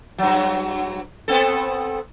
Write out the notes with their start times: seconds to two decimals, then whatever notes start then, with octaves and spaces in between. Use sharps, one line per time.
0.18 G2 F#3
1.28 B3 C4 A4